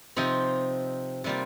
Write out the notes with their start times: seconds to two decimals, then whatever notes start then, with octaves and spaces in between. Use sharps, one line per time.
0.16 C3 F3 C4 D#4
1.24 C3 G3 A#3 F4